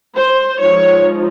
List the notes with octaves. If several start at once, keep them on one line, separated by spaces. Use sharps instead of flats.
C5
F3 G#3 D#4 C#5